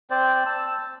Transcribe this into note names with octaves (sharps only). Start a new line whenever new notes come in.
C4 C5 D5
A5 E6